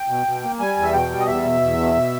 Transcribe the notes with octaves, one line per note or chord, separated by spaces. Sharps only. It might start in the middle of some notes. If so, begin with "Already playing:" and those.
Already playing: G5
B2
B2
A#3
G3 G#5
E2
E5
B2 G5
G3
D#5
E2 E5
B2
E2
B2
B2